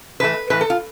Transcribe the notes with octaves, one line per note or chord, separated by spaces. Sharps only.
A2 E3 A3 B4
A2 E3 A3 B4
A4
F4